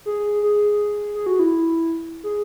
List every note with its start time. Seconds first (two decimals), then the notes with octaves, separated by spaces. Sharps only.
0.06 G#4
0.43 G#4
1.15 G#4
1.26 F#4
1.39 E4
2.24 G#4